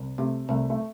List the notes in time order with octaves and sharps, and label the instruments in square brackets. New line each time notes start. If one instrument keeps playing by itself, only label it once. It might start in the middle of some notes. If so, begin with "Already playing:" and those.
Already playing: [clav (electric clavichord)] C2
[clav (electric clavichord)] C3 [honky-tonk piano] A3
[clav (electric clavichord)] C2 [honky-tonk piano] A3
[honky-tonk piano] A3